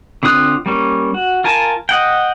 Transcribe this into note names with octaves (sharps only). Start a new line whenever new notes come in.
D3 C4 F4 D#6 F#6
G3 A#3 C#4
F#4
F4 A#4 G#5 A5
D#5 F#5 G5